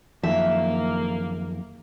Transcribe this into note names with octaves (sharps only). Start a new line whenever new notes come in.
F#2 D#3 F3 A#3 E5